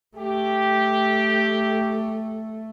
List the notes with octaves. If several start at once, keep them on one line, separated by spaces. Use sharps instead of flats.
A3 G4